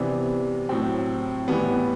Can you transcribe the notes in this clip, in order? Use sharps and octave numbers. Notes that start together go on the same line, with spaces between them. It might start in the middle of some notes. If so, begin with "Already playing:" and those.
Already playing: C3 E3 B3 D4
A2 F#3 C4
A2 E3 G3 B3